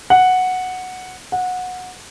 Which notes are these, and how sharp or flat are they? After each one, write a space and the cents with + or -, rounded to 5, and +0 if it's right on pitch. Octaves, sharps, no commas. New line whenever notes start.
F#5 -5
F#5 -20